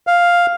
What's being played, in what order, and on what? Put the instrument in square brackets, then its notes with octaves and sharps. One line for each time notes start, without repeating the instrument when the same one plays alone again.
[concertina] F5